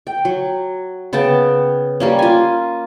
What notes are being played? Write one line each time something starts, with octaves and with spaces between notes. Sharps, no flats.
G5
F#3
C#3 B3 G5 A5
G3 A#3 C#4
F4 G#5